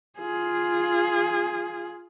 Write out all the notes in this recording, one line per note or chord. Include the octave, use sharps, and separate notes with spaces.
F4 G#4